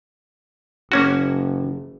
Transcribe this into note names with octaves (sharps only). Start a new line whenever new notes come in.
F#1 A#3 C#4 F#4